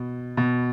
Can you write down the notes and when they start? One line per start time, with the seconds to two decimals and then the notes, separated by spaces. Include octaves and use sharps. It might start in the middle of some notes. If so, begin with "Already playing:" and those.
Already playing: B2
0.37 B2